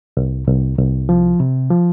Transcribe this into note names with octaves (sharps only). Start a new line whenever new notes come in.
C2
C2
C2
F3
C3
F3